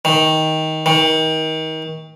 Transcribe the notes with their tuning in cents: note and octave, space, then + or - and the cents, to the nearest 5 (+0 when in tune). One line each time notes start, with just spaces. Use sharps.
D#3 +15
D#3 +30